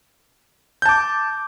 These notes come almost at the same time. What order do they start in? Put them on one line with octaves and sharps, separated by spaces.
G6 A5 D6